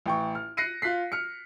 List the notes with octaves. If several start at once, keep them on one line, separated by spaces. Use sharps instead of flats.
A1 G5 C#6
F6
F#6 A#6 C7 C#7 D#7
F4 F#6 B6 C7
F6 C#7